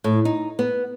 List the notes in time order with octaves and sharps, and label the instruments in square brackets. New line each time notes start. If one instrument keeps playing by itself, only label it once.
[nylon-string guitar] A2
D#4
B3